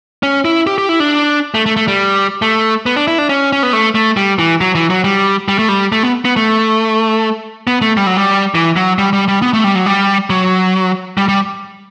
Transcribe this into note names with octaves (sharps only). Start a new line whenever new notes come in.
C#4
E4
G4
G4
E4
D4
A3
A3
A3
G3
A3
B3
D4
E4
D4
C#4
C#4
B3
A3
A3
G3
E3
F#3
E3
F#3
G3
G3
A3
G3
A3
B3
B3
A3
B3
A3
G3
F#3
G3
E3
F#3
G3
G3
G3
B3
A3
G3
F#3
G3
F#3
G3
G3